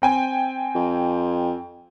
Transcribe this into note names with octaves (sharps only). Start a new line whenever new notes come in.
C4 G5 G#5
F2